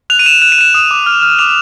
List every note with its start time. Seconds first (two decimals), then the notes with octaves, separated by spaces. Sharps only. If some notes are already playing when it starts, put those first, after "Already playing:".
0.10 F#6 F7
0.19 D#7
0.26 F#6 E7
0.42 F#6 E7
0.52 D#7
0.58 F#6 E7
0.74 D#6
0.91 D6
1.06 F6
1.22 F6
1.39 D6 F7